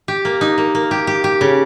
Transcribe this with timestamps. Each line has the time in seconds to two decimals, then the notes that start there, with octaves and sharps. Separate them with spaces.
0.08 G4
0.25 A#3
0.41 D#4
0.58 A#3
0.75 A#3
0.91 G4
1.07 G4
1.24 G4
1.41 C#3